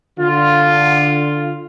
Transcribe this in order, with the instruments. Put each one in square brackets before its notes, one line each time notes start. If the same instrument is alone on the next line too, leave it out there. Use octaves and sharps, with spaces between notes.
[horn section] D3 F4